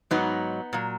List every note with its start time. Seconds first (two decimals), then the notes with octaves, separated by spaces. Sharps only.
0.11 G#2 F#3 B3 D#4
0.73 A#2 F#3